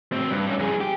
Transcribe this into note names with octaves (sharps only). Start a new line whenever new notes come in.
A2 C4
G2
G3 C#4
F2 G#4
G4